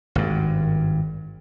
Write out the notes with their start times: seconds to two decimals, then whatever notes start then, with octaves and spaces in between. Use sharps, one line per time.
0.15 G#1 G2